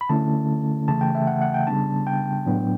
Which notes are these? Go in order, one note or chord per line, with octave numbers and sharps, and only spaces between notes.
B5
D3 A3 C#4 E4 A5
C#3 E3 A3 A5
G5
E5
F#5
F#5
G5
C#3 G3 B3 D4 A5
G5
A2 F#3 B3 D4